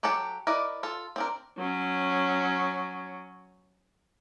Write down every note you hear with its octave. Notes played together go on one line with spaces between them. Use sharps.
F#3 G4 A4 F#5 A5
E4 A#4 B4 D5 D#5
F4 A4
C4 D4 A#4
F#3 C#4